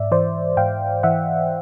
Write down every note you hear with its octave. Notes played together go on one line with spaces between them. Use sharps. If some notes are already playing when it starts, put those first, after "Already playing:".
Already playing: G#2 D5 E5
E3 C5 D5
G#2 F5 G5
E3 E5 F#5